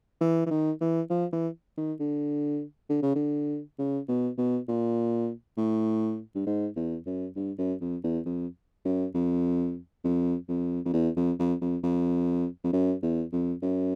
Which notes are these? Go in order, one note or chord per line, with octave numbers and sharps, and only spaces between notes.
E3
E3
D#3
E3
F3
E3
D#3
D3
D3
C#3
D3
C#3
B2
B2
A#2
A2
G2
G#2
E2
F#2
G2
F#2
F2
E2
F2
F#2
F2
F2
F2
F2
E2
F2
F2
F2
F2
F2
F#2
E2
F2
F#2